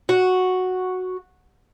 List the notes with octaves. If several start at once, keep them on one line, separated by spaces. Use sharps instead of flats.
F#4